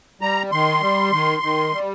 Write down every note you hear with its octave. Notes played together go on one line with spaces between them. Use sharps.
G3 A#5
D#3 C6
G3
D#3
D#3
G3